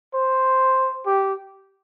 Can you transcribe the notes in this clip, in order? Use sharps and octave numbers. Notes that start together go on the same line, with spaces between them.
C5
G4